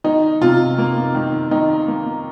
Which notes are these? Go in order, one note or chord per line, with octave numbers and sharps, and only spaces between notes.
D#3 D#4
C3 F4
A#3
D#3
D#3 D#4
A#3